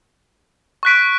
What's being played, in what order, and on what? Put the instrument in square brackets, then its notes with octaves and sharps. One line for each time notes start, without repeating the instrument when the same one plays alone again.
[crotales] C#6 F#6 B6 D7